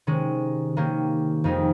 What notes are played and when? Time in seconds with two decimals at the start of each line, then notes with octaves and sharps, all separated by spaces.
0.07 C3 D#3 G#3 C#4
0.76 D#3 A#3 C#4 G4
1.44 F2 D#3 G#3 D#4